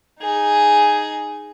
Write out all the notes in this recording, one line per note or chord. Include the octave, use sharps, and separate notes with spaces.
D#4 G#4